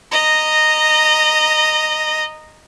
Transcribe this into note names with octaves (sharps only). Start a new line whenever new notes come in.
D#5 A#5